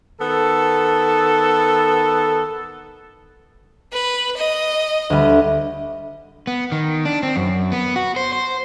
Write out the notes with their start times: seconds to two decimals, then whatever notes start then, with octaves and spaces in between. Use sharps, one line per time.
0.20 D#3 B3 A4
3.92 B4
4.37 D#5
5.10 D2 G3
6.47 B3
6.72 D#3
7.05 D4
7.23 C4
7.36 F#2
7.72 B3
7.96 F#4
8.16 C5
8.33 C5